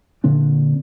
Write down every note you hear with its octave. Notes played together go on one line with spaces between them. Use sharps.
A#2 D3 C4 D4